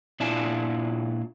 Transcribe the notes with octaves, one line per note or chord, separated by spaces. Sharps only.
A#2 D4 E4 F4 G#5 A5